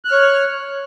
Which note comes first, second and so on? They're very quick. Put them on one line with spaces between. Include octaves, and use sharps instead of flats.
F#6 F6 C#5